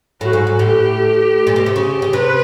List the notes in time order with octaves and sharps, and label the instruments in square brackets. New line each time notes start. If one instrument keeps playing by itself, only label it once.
[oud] A2 [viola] F#4
[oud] G#2
G#2
[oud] A2 [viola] G4
[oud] A#2
B2
C3
[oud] C#3 [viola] G4
[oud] C#3
[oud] C3 [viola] B4